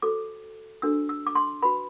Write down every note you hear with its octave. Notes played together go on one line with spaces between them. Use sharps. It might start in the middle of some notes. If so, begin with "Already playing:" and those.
F#4 A4 C5 D6
D4 F#4 A4 C5 E6
E6
D6
C6
F#4 B4 B5